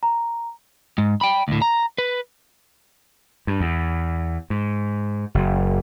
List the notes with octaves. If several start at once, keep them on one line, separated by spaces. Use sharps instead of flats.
A#5
G#2
G5 B5
D2 A2
A#5
B4
G2
E2
G#2
F#1